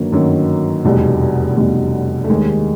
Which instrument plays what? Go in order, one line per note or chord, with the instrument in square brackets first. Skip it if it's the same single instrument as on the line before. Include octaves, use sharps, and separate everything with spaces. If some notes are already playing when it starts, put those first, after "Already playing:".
Already playing: [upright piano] G1 D#3 F#3 A#3
G1 F#2 D#3 F#3
F1 E2 B2 G3
F1 E2 B2 G3
A3
D#2 D#3 G3 G#3